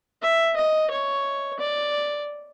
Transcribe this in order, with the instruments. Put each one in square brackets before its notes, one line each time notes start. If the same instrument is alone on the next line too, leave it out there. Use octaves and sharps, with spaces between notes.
[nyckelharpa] E5
D#5
C#5
D5